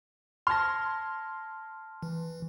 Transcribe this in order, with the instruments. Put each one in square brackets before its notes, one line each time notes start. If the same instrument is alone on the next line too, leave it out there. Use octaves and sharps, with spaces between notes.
[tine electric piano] A5 F6 [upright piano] C6 G#6 A#6
[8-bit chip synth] E3